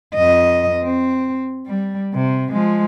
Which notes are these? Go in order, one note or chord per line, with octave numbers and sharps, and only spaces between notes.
F2 D#5
C4
G3
C3
F3 G#3